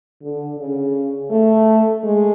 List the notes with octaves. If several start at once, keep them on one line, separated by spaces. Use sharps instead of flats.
D3
C#3
A3
G#3